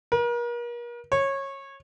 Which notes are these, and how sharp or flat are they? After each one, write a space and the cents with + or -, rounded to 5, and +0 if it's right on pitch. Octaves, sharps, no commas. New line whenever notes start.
A#4 +40
C#5 -20